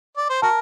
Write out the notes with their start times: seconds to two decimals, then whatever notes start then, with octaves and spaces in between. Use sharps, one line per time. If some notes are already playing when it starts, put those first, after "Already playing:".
0.17 D5
0.30 C5
0.42 F#4 A#4 A5